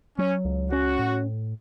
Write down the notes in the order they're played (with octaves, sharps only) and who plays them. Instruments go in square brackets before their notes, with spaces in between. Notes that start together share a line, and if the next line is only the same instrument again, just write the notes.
[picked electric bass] F#3 [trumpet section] C#4
[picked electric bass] C#2
[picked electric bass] C#4 [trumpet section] F#4
[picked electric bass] A2